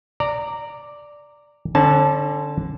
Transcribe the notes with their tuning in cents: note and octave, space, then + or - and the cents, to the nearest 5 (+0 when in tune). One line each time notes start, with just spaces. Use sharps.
D5 +0 A#5 -15
D3 +0 C#4 -40 A5 -15